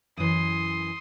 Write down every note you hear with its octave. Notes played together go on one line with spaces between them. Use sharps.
F#2 E3 C6 D#6